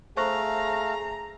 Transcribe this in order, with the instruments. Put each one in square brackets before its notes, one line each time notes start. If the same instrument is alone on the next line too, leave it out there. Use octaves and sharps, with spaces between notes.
[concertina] A3 F5 [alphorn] G#4 [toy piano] C5 C#6 [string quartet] A#5